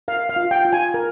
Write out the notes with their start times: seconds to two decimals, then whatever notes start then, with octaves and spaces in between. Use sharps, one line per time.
0.08 A#4 F5
0.29 F5
0.36 F4
0.51 G5
0.65 F4
0.73 G#5
0.94 A#4